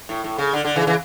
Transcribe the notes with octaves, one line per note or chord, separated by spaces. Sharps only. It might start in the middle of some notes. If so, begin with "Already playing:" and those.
A2
A2
C#3
D3
D3
C#3 E3
C#3 E3